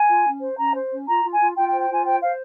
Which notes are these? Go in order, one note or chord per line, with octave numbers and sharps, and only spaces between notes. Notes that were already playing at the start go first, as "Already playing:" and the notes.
Already playing: G#5
F4
C#4
C5
C#4 A#5
C5
C#4
F4 A#5
F4
G#5
F4
F4 G5
C5 G5
G5
F4 G#5
C5 G5
C5 F5